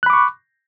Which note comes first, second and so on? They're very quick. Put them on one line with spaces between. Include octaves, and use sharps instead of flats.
F#6 B5 D6 C#6